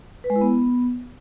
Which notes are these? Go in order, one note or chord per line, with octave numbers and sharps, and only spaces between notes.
B4
G#3
E4
B3